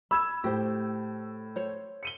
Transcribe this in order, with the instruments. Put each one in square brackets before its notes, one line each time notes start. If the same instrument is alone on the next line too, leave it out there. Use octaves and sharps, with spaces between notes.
[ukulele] B5 [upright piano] E6 G#6 E7
[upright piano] A2 [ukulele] G4 C5
[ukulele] C5 C#5
[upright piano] C#7 D#7 G7